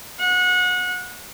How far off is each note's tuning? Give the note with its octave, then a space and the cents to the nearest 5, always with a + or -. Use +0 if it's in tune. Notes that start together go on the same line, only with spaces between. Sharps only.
F#5 -30